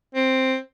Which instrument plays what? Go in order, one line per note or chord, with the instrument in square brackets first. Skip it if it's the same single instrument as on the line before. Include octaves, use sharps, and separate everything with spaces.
[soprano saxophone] C4